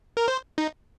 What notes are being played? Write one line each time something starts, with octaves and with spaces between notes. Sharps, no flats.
A#4
C5
D#4